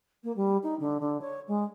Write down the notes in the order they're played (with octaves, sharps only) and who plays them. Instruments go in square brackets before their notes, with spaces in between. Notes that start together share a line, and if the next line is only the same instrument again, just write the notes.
[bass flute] A#3
G3
D#4
D3
D3
C#5
G#3